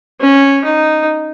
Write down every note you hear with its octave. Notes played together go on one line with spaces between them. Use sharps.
C#4
D#4